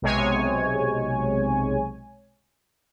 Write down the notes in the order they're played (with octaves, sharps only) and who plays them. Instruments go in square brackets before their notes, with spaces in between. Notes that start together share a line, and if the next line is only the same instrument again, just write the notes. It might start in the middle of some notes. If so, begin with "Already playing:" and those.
[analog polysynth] B1 C3 G#3 C#5 G#5